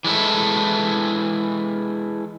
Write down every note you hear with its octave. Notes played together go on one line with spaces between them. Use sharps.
E3 G#3 E4 A4